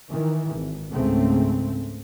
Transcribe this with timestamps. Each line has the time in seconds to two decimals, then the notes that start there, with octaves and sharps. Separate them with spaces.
0.10 D#3 E3
0.55 G#1
0.93 C#2 G#2 C#3 A3 C4